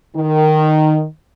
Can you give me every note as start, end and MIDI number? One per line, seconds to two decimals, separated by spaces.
0.16 1.05 51